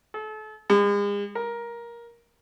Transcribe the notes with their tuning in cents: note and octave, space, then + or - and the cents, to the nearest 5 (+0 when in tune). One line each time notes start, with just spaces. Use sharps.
A4 -35
G#3 -40
A#4 +15